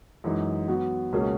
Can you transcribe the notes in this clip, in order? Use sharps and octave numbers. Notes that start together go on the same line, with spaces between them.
F#2 E3 G#3 D#4
F#3 B3 F#4
C#2 B2 A#3 C#4 G#4